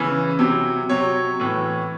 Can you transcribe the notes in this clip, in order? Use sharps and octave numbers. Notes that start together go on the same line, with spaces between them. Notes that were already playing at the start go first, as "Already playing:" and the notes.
Already playing: C#3 E3 G#5
C3 F#3
C3 F#3 C#5
A2 E3